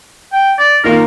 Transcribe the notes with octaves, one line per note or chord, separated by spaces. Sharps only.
G5
D5
D#3 A#3 F4 A#4